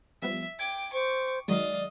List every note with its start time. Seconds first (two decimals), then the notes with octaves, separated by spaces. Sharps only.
0.22 F3 G3 B3 E5
0.59 G5 D6 G#6
0.93 C5 C#6 D6
1.48 D#3 F#3 G#3 D5 D#5 F5